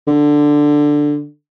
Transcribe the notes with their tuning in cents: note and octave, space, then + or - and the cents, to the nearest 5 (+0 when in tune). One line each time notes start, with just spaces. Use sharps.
D3 +5